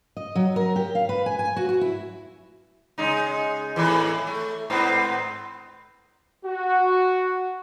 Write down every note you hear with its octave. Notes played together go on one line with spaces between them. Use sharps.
D#5
F#3
A#4
G4
F5
B4
G#5
G#5
F#4
F#4
E4
C#3 G#3 D#4
E2 A2 E3
A3
G#2 B3 C4
F#4